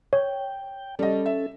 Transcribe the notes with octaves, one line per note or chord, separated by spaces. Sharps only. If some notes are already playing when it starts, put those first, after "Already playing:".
C#5 G5
G3 C#4 A4 D#5
E5